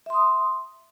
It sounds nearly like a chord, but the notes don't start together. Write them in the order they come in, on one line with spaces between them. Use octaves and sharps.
E5 C6 D#6